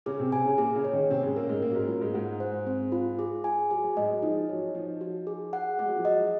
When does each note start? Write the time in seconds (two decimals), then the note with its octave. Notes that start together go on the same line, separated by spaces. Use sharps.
0.06 C#3 C#4 G#4
0.19 C3 C4
0.32 C3 C4 G#5
0.45 C#3 C#4
0.58 A#2 A#3 G#4
0.75 C#3 C#4
0.84 C#5
0.93 D#3 D#4
1.10 C3 C4 C#4
1.23 G#2 G#3
1.36 A#2 A#3 A#4
1.49 G#2 G#3
1.62 A#2 A#3 C#4
1.70 F#3
1.75 G#2 G#3
1.88 F#3 F4
2.01 G#2 G#3
2.14 G#2 G#3 F#5
2.40 C5
2.67 C4
2.92 F4
3.19 G#4
3.44 G#5
3.70 F#3 G#4
3.84 F#3
3.97 G#2 G#3 D#5
4.10 F#3
4.22 F3 D#4
4.49 F#3 C#5
4.75 F3 D#4
5.01 F#4
5.27 G#4
5.53 F#5
5.79 G#3 G#4
5.88 F#3
5.96 F3
6.05 F#3 D#5